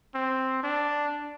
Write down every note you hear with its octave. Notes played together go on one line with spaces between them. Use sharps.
C4
D4